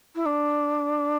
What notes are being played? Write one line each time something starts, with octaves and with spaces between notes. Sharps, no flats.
E4
D4